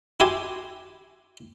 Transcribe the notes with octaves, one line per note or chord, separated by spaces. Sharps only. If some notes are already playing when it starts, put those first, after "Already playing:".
E4 F#4 G4 G#5 C6